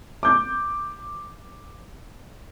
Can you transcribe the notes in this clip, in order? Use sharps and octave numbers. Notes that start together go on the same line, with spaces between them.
D6 G6